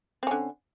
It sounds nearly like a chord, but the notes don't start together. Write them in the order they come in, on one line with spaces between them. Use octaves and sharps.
C4 C#4 D3